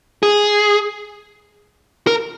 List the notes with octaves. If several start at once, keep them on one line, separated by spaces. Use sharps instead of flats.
G#4
A#4